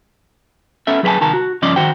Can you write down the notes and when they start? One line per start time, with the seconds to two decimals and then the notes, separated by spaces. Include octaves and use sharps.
0.87 B3 C#4 A4 E5
1.03 F#3 G#4 B4 D5 G#5 A5
1.21 C2 D#3 A#4 A5
1.33 F#4
1.62 G2 C#3 F3 C#4 D5 D#5
1.76 D#3 F#4 C5 G5